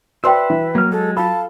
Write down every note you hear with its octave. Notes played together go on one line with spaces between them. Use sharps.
F#4 B4 C5 D5 E5 G5 C6
E3
F#3 A#3 F6
G#3 A4
F4 A4 F5 A5 B5